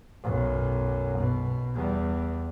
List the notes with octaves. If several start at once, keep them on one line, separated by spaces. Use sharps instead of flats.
B1 F#2
B2
E2 G3